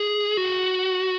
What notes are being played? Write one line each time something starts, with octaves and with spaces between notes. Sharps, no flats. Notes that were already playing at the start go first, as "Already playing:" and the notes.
Already playing: G#4
F#4